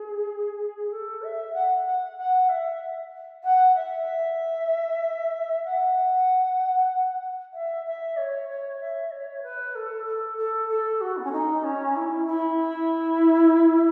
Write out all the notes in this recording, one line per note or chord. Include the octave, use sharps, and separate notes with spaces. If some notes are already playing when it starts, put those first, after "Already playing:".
Already playing: G#4
A4
E5
F#5
F#5
F#5
E5
F#5
E5
F#5
E5
E5
C#5
C#5
E5
C#5
B4
A4
A4
A4
A4
F#4
B3
C#4
D#4
C#4
E4
E4